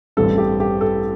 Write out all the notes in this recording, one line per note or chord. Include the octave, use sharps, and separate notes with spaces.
A1 G2 G3 C4 A4
G4
G4
A4